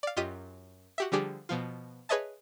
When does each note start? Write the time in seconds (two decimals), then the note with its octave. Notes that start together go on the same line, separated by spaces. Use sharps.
0.03 D5 F5
0.17 F#2 F4 G4 D#5 B6 D#7
0.98 F#4 G4 E5
1.12 D3 F3 G3 D4 G4 G#4
1.49 B2 F3 F4
2.09 G#4 B4 C#5 D#5 E5 A5